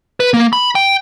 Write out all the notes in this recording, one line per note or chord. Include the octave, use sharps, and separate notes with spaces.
B4
A#3
B5
G5